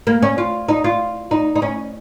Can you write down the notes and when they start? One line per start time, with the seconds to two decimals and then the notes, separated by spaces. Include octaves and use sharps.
0.07 A#3
0.22 C#4
0.38 F4
0.68 D#4
0.84 F4
1.31 D#4
1.56 D#4
1.62 C#4